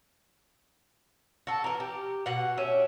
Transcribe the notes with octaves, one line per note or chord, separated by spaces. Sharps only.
F#4 A4
E3 A#4
G4
B2 F#5
C#4 G4 E5